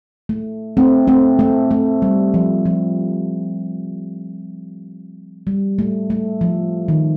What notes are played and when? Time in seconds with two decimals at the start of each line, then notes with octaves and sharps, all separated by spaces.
0.29 A3
0.77 A3 C4
1.08 A3 C4
1.39 A3
1.71 A3
2.02 G3
2.34 F3
2.66 F3
5.47 G3
5.79 A3
6.10 A3
6.41 F3
6.88 D#3